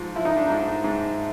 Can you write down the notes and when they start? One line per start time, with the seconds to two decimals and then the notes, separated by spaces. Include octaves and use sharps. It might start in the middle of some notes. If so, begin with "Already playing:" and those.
Already playing: G#2 F3
0.15 F3 E4
0.25 D#4
0.37 D4
0.47 G#2 D#4
0.84 G#2